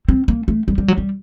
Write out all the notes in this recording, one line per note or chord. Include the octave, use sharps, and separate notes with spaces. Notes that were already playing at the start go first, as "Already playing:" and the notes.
C4
A#3
A3
G3
G3
F#3
G3